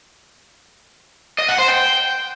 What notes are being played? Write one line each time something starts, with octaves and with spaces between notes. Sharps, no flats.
D#5
F#5
C5
G5